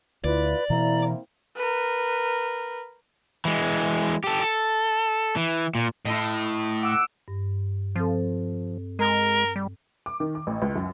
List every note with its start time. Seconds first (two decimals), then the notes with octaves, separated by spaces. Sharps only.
0.24 D2 E4 F4 B4 D5
0.70 B2 E3 A#3 C4 E4 A#5
1.57 A#4 B4
3.45 E3 G#3
4.24 G4 A4
4.41 A4
5.36 E3
5.75 A#2
6.05 A2 E4 A4 D#5
6.83 F#5 D6 E6
7.28 G2
7.96 F3 C4 A4
8.99 G#3 A#4
9.56 G3
10.06 D6
10.20 D#3
10.35 D6
10.47 A1
10.62 C#2
10.75 F#2